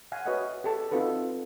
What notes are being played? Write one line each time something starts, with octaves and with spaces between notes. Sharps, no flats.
F5 F#5 G#5
F#4 B4 C#5 D#5 E5 F#5
G4 A4 A5
C4 D#4 F4 F#4 A4 B4